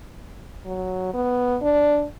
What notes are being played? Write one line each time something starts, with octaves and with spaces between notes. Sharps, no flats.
F#3
B3
D4